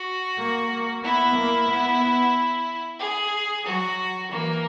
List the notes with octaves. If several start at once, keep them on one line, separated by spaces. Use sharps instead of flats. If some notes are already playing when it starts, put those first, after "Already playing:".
Already playing: F#4
A#3
B3 E4
A#3
B3
G#4
F#3 F#4
E3 A#3